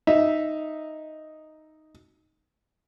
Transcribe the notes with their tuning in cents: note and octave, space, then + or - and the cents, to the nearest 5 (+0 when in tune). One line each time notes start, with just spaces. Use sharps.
D#4 +0 E5 -5